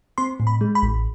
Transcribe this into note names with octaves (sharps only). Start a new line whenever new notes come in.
C4 C6
A2
B5
G#3
B5
A1